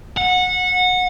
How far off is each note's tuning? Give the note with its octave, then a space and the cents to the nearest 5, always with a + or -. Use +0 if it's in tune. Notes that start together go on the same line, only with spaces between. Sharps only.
F#5 -20